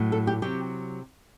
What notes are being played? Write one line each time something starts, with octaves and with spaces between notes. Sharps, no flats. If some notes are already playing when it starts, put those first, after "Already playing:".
Already playing: A2 F#3
A4
G4
C3 F#3 G4